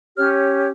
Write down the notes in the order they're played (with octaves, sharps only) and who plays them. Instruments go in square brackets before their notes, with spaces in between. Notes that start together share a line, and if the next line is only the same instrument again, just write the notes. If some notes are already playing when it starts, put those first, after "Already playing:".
[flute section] C#4 G4 C#5 F6